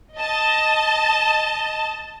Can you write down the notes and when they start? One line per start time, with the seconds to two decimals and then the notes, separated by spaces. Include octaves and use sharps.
0.17 D#5 A5